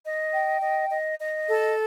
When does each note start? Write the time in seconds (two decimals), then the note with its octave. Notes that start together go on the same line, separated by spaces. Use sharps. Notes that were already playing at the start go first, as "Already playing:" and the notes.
0.03 D#5
0.32 G5
0.61 D#5
0.90 D#5
1.19 D#5
1.48 A4